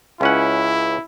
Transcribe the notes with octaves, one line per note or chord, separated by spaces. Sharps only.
C#2 C#4 E4 F#5